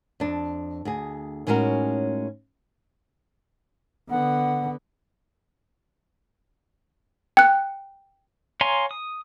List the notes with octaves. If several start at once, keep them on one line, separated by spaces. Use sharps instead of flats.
F2 D4
D2 G#4
A2 G#3 C#4 D#4 F#4 A#4
D3 B3 F#5
G5 F#6
C#5 F5 G#5 A#5 C6
D#6